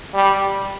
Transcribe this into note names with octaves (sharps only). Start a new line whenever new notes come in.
G3